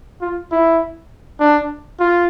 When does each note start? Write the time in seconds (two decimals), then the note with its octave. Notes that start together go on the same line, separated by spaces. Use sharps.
0.21 F4
0.52 E4
1.40 D4
2.00 F4